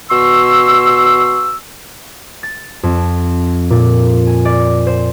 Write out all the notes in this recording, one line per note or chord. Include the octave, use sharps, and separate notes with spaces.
B2 C6 C#6 E6
A6
F2
A#2
G#5
D5
C5